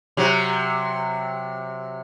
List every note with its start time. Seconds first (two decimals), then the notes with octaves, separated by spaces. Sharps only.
0.17 C3 F#3